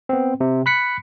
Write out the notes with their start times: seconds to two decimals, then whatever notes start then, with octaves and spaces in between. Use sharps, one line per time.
0.09 B3 C4
0.40 C3
0.66 B5 F#6 B6 C#7